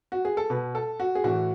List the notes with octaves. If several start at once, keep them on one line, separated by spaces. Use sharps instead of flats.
F#4
G#4
A4
B2 B4
A4
F#4
G#4
A2 E3 F#4